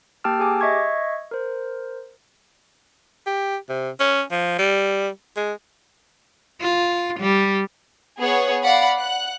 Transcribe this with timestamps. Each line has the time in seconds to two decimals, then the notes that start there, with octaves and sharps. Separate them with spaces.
0.24 A#3 G4 G5 A5 E6 F6
0.39 G4 G#4 G#5 D6
0.61 D#5 E5 C#6 G#6
1.31 A#4 C5
3.26 G4
3.69 C3
4.00 C#4
4.31 F3
4.59 G3
5.36 G#3
6.61 F4
7.20 G3
8.20 B3 G#4 C#5 F#5
8.63 D5 F5 F#5 B5
8.99 F#5 F#6